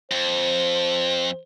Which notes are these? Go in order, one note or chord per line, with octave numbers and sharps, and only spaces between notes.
F2 C5